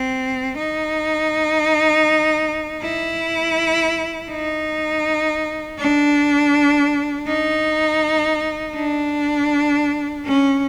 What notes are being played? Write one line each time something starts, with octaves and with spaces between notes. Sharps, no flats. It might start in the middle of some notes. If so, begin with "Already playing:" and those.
Already playing: C4
D#4
E4
D#4
D4
D#4
D4
C#4